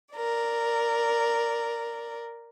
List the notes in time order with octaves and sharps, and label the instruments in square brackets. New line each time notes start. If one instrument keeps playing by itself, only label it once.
[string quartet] A#4 D5